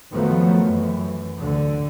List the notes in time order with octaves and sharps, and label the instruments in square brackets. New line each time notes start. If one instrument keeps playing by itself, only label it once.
[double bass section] F#2 D#3 F3 F#3 A3 B3
F#2 E3
D2 D3